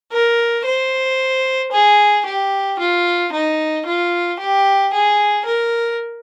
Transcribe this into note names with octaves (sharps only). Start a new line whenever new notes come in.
A#4
C5
G#4
G4
F4
D#4
F4
G4
G#4
A#4